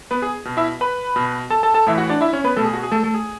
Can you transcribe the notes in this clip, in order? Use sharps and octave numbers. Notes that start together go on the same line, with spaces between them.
B3 B4
G#4
B2
E4 E5
B4 B5
B2
A4 A5
A4 A5
A4 A5
A2 E3 E5
F#4 F#5
D4 D5
E4 E5
C#4 C#5
B3 B4
B2 A3 A4
G#4
F#4
G#4
A3 A4
A3 A4
G#4